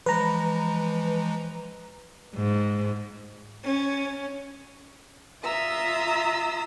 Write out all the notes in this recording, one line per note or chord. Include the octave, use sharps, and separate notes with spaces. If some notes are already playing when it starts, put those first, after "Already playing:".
E3 F3 G#3 B4 A#5
G#2
C#4
F4 E5 A#5 D#6 E6